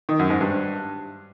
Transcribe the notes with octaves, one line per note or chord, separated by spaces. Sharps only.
D#3
F#2
G#2
G2